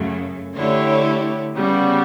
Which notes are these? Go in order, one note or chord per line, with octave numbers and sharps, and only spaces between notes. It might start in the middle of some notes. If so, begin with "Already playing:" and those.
Already playing: F#2 C#3 F#3 A3
D3 A3 E4 G4 C#5
C#3 G3 B3 F#4